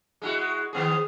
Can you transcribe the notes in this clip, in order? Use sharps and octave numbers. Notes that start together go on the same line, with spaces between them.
G#3 E4 F#4
D#3 B3 G#4